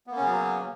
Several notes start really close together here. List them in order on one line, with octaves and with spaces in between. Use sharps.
B3 A#3 C#4 C#3 F#3